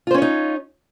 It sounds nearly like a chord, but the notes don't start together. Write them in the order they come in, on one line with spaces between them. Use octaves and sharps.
F4 C5 C#4 C#5 D#4